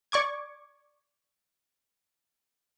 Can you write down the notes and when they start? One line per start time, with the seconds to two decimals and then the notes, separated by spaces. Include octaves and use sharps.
0.12 D5 C#6 D6 G#6